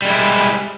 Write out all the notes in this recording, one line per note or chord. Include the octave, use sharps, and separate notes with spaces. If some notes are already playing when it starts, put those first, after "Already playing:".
G3 G#3 E4